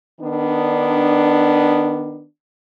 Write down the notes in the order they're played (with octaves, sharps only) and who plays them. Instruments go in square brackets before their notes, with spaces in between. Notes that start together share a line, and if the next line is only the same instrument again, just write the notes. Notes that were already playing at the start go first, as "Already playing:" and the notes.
[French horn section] D#3 B3 D4